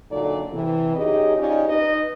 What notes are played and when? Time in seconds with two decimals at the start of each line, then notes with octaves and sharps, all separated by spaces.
0.11 A#2 D3 F#3 D#4 A4 D5
0.53 C3 E3
0.96 F#2 D#4 G4 G#4 C#5 D#5
1.37 C#4 D#4 F4 G4 D5 D#5
1.67 D#4 B4 D#5